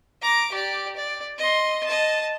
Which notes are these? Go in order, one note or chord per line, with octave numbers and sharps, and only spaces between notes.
A#5 D6
G4 D5
D5
D#5 C6
D#5 A5